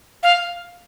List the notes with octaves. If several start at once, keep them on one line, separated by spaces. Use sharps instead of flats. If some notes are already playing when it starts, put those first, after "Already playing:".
F5